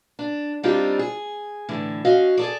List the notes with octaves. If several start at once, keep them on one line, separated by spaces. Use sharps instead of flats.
D4
G3 C4 D4 D#4 F4 G4
G#4
A2 D3 E3
C#4 F#4 D#5 F5
G#4 A4 D5